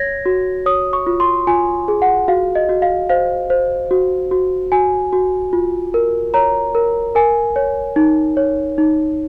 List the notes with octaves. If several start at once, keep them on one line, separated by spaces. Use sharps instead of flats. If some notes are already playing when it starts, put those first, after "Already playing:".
Already playing: C#5 G#6 A#6
F#4
C#5 D#6
C#6
F4
C6
F4 G#5
G#4
F#5
F#4 F5
D#5
F#4
F5
C5 F5
C5
F#4
F#4
F#4 G#5
F#4
F4
A#4
C#5 A#5
A#4
A#4 G#5
C#5
D#4
C#5
D#4